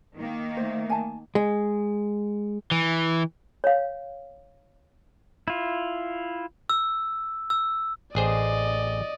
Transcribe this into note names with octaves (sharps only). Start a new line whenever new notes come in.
D#3 A#3
A3 C5
G#5 A5
G#3
E3
C#5 F5
E4 F4
E6
E6
A1 G#4 C5 D5 D#5